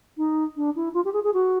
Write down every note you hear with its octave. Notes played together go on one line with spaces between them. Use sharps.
D#4
D4
E4
F4
G4
G#4
G#4
F#4